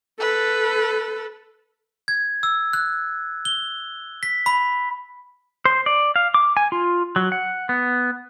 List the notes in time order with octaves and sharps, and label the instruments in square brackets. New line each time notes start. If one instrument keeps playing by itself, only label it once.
[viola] A4 [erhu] B4
[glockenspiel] G#6
E6
F#6
G7
B6
B5
[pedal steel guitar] C5
D5
F5
D6
G#5
F4
F#3
F#5
B3